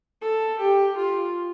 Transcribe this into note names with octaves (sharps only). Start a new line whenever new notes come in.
A4
G4
F4